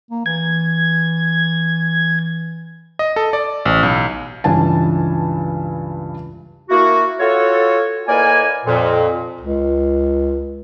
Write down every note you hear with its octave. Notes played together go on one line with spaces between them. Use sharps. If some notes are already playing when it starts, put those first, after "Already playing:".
A#3
E3 G#6
D#5
A4
D5
A1
B1
C#2 G2 E3 G#5 A5
A#3 E4 F#4
F4 F#4 A4 C#5
A2 A#3 B4 D5 D#5 G#5
F2 A#2
C#2